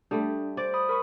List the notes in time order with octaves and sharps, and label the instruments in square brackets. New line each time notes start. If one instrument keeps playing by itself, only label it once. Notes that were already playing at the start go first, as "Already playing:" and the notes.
[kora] G3 A3 [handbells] D4
[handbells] C5 [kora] D5
[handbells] B5 D#6
A#4 B5 C#6